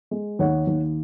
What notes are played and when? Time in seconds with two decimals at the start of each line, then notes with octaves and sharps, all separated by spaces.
0.11 G#3
0.39 D#2 C#5 F#5
0.67 D#2